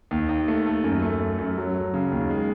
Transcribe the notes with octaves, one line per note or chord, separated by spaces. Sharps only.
D#2
D#2
A3
A3
F#2
A3
A3
F#2
F#3
F#3
C#3
D#2
G#3